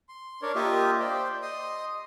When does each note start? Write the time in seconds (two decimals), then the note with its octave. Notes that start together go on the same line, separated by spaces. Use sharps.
0.09 C6
0.42 D4 A#4 C#5 D5
0.55 A#3 F4 G4 D#5 E5
1.00 C5 D5 G5
1.42 D#5 C6 D#6